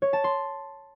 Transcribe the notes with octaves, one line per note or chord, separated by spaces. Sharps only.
C#5
A5
C6